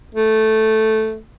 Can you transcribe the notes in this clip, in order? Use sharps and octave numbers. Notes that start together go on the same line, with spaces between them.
A3